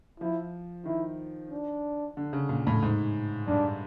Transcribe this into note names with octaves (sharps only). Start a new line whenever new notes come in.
F3 E4
D#3 E4
D4
D3
C#3
A#2
A2
G#2
G2 D4